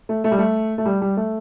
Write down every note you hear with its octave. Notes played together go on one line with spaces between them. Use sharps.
A3
A3
G3
A3
A3
G3
G3
A3